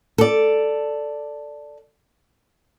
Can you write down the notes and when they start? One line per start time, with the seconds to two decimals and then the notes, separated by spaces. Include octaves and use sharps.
0.18 A4 D5